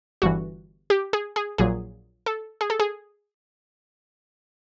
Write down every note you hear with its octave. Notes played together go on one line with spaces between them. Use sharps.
G1 G2 E3 F#4
G4
G#4
G#4
A#1 A#2 F#3 G#4
A4
G#4
A4
G#4